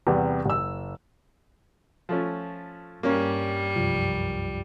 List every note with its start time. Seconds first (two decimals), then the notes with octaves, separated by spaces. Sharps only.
0.07 E2 C3 G3 B3
0.46 F#1 E6
2.09 F3 A3 C#4
3.03 G2 G3 A#3 C#4
3.76 C2 F#2 F3